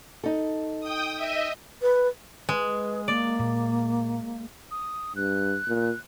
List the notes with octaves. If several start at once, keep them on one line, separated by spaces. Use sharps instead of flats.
D#4 A4
G5 D#6
D#5 E5
B4
G#3 B4
A#3 D5
A#2
D#6
G2 F#6
A#2